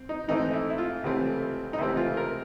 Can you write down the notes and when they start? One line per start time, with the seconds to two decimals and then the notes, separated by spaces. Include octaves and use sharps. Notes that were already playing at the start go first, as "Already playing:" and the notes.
Already playing: C4
0.09 D#4
0.28 G#2 E3 A3 C4 D#4
0.53 E4
0.70 E4
0.78 F4
1.04 C#2 C3 E3 A3 C4
1.73 D#4
1.78 C#2 C3 E3 A3 C4 E4
1.97 F4
2.17 A#4